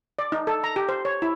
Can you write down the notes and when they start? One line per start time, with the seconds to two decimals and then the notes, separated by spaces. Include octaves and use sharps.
0.19 D5
0.32 D#4
0.47 A4
0.64 A#5
0.76 G4
0.89 C5
1.05 C#5
1.22 E4